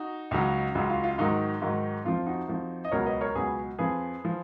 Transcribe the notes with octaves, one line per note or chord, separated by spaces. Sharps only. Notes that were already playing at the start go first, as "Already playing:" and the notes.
Already playing: D#4 F#4
C#2 C#3 F#3
C#2 C#3 F#3 F4
F4
F4
G#2 D#3 F#3 D#4
G#2 D#3 F#3
F2 F3 F4
D#4 F#4
F2 F3
D#5
C#2 B2 F#3 A#4 C#5
B4 D#5
A#4 C#5
C#2 B2 F#3 G#4 B4
F2 F3 G#4 B4
F3